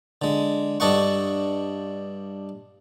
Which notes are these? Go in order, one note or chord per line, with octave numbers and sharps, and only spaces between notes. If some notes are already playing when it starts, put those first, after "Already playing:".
D3 G#3
G2 D4 A4 D#5 F#5 C#6